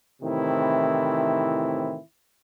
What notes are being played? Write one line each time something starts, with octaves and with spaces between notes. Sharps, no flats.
A2 C3 D#3 E3 C4 E4